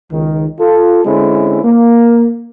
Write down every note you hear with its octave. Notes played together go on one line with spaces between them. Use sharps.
C#2 D#3
F4 A4
D3 G#3 C4 C#4 E4
A#3